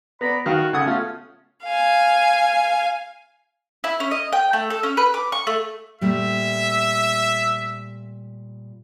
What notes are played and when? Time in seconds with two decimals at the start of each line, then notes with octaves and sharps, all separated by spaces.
0.21 B3 D5 A#5 B5
0.46 D#3 F#4 F5
0.73 C#3 A4 F#5 G#5 D#6
0.86 A3 B3 C#4 F4
1.64 F5 G#5
3.84 E4
4.00 C#4
4.11 D#5
4.32 G5
4.53 A3
4.70 A4
4.83 C#4
4.97 B4
5.14 D6
5.32 C#6
5.47 A3
6.01 A#2 G3 A3 E5